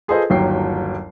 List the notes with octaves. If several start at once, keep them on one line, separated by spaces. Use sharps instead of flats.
F4 G#4 A4 B4 C5 D#5
G1 D#2 F#3 G5 C7